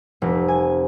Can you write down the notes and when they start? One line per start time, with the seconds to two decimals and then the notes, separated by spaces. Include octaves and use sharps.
0.22 F1
0.48 G#5